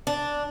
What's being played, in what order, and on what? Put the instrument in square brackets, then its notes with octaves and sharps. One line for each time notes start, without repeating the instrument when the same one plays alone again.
[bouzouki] D4